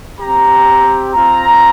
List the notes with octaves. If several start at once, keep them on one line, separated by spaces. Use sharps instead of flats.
C4 G4 A#5
C4 F4 A#5